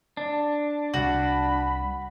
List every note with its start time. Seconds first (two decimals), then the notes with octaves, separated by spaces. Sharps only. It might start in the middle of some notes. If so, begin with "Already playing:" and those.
0.17 D4
0.94 C2 G3 F#4 B5